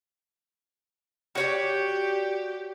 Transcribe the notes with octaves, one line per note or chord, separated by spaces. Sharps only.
F#4 G4 C#5 D5